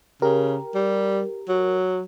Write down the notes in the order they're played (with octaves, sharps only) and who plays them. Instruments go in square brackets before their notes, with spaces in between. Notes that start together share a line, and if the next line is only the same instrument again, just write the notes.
[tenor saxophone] C#3 [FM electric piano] G4 A#4
[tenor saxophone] G3
F#3